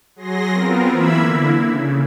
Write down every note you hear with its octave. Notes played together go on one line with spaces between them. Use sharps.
F#3 G#4 C6 A#6
B3 C4 F4 A#4
E3 A#3 E5 B5 E6 G#6
D3 A#3 E4
C#3